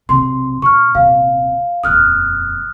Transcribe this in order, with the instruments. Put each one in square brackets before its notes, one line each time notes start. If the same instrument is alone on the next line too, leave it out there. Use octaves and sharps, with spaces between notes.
[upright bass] B1 C3 [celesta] C6
[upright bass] A#2 [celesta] C#6 F6
[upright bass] D#1 C3 [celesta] F5
[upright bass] D#1 F2 [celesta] D#6 F6 F#6